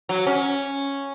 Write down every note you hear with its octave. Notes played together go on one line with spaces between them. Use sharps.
F#3
C#4